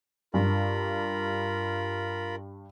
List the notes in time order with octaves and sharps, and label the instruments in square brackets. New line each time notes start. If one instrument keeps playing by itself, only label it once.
[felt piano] G2 [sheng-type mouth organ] F4 A#4 B5